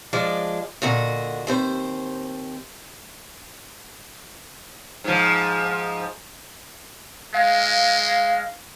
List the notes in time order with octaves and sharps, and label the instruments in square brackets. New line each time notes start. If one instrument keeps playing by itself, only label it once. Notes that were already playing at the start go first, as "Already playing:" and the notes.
[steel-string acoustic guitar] F3 G#3 D4 D5
A#2 D3 F#4 D#5
D#2 C4 C5
[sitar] G#2 F3
[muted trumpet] G#3 [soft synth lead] F5